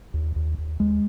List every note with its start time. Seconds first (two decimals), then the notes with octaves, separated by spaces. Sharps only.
0.14 D#2
0.36 D#2
0.58 D#2
0.80 D#2 G#3